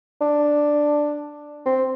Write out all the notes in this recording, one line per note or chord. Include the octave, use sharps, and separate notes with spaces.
D4
C4